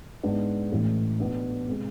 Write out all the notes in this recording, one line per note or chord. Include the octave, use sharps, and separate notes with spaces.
G#2 G#3 B3 D4
A1 A2 E3 A3
B1 B2 B3 D4
C3 G#3 C4 G#4